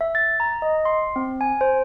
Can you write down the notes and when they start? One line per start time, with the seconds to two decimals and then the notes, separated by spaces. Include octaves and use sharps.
0.01 E5
0.15 A6
0.40 A#5
0.62 D#5
0.85 C6
1.16 C4
1.41 G#5
1.61 C5